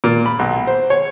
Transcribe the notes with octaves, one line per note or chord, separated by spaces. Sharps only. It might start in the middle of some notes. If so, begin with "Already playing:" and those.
A#2
B5
B1
C5
C#5